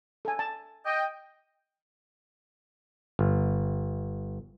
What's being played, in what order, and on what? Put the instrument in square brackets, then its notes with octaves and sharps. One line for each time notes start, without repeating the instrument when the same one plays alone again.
[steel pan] A4 G#5
A5
[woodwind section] D#5 G5
[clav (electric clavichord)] G1